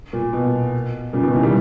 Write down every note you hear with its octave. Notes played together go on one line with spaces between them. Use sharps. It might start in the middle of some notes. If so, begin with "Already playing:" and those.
A#2
B2
A#2 C#3
B2 D#3
C#3 E3
D#3 G3